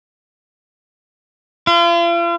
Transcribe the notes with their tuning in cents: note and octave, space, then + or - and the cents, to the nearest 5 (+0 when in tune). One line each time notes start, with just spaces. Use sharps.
F4 -40